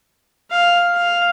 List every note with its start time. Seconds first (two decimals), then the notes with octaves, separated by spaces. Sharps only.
0.51 F5
0.95 F5